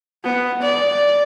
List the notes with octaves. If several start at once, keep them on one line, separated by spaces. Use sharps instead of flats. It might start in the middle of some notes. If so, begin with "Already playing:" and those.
B3
D5